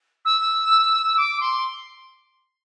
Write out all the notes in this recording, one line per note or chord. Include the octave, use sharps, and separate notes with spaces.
E6
D6
C6